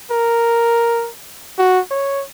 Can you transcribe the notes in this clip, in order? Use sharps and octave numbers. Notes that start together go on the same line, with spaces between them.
A#4
F#4
C#5